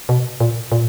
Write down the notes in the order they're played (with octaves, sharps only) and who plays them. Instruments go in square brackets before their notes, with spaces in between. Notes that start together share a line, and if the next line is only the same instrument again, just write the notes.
[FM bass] B2
A#2
A#2